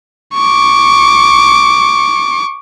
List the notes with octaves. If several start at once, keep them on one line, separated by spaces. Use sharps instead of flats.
C#6 D6